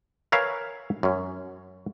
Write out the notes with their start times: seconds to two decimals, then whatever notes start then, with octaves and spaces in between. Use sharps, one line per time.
0.32 A#4 B4 C#5 E5 F5 G#5
1.03 F#2 C#4